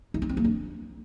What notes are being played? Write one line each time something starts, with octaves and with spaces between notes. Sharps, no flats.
E4
C#4
C4
A#3
D4